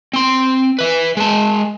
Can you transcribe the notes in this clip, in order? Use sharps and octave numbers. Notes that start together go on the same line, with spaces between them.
C4 C6
B4 E5
G#3 A5